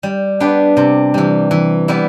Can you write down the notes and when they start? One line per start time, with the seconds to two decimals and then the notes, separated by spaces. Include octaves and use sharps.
0.03 G3
0.40 B3 D4 G4 B4
0.77 C3
1.14 E3 G3
1.51 E3
1.88 G3 B3 E4 B4